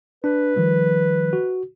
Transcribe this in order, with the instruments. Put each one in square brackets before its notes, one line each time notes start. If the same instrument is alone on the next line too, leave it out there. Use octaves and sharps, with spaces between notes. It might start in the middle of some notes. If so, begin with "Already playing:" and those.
[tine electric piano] D4 [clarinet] B4
[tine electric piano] D#3 F3 G3
F#4